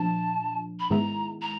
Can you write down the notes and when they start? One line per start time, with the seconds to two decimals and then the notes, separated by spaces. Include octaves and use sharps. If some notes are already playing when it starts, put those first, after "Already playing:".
Already playing: A#2 F3 D4 A5
0.80 B5
0.90 G#2 D#3 G#3 B3 E4 A#5
1.42 A#5